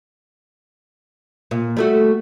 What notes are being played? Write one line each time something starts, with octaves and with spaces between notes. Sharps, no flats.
A#2
G3 A3 F#4